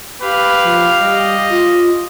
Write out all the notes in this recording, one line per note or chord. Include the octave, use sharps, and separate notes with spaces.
G4 B4 F5
F3
G3 D#5
F4